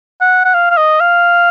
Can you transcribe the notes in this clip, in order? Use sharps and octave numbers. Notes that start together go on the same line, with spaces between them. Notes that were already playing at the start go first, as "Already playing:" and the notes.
F#5
F#5
F5
F5
D#5
F5